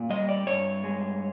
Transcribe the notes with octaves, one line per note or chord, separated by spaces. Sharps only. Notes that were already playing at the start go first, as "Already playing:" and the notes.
Already playing: A#2
G3 D#5
D5
G2 C#5
G#3